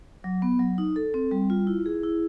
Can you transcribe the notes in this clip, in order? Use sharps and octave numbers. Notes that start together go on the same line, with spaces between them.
F#3
B3
F#3
D#4
A4
C4
G3
F4
E4
G#4
E4